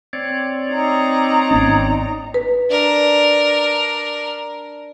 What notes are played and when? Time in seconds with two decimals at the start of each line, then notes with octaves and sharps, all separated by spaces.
0.13 C4 C#5 D5
0.72 D#4 A#5
1.51 G#1 B3 C#4
2.34 B4
2.70 D4 A#4